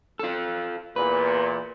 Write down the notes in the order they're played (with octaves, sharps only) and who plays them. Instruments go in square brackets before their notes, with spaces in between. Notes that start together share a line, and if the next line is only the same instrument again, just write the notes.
[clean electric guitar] F4 A4
[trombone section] E2 A#2 [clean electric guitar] B4